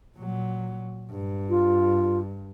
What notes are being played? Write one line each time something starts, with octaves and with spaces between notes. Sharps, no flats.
A#2 F#3
G2
F4